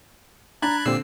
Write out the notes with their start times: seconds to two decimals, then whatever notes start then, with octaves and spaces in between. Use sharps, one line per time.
0.62 D4 A#5 B5 F#6 G#6
0.86 A#2 D3 C4 G4 E6 C7